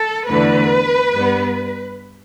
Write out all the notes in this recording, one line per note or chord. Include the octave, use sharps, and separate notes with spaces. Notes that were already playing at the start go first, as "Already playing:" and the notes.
Already playing: A4
E2 D3 A3 B4
G2 G3 B3